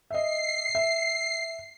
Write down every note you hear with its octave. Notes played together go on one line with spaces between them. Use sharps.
D#5 E5 C7
E5